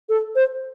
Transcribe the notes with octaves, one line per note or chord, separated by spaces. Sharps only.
A4
C5